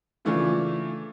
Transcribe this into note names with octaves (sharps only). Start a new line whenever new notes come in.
C#3 E3 A3 D4 F4